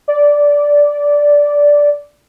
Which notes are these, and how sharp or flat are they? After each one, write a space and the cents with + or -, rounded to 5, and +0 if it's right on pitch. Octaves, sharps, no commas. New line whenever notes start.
D5 -10